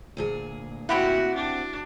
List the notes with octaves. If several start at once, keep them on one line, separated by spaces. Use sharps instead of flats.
D2 A#2 G#4
C4 E4 F#4 G4 F#5
D4